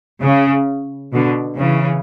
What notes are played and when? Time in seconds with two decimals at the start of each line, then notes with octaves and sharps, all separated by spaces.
0.22 C#3
1.14 B2 D3
1.59 C#3 E3